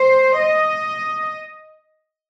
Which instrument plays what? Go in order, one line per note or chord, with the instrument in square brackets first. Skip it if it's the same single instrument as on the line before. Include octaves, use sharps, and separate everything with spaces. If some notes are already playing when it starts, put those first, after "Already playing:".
Already playing: [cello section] C5
D#5